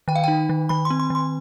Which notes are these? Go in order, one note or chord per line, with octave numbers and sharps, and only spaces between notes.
D#3 G5
F5
D#4 G5
D#3
D#3 B5
C6
C4
C6
D#3 C6